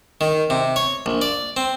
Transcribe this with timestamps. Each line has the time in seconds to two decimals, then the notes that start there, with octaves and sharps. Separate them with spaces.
0.21 D#3
0.50 C3
0.76 C#5
1.06 A#1
1.22 D5
1.57 C4